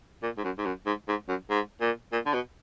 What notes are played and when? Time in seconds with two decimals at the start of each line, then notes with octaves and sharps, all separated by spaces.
0.23 A#2
0.37 G#2
0.44 F#2
0.58 G#2
0.65 F#2
0.86 G#2
1.08 G#2
1.28 F#2
1.50 G#2
1.81 A#2
2.12 A#2
2.26 D3
2.33 B2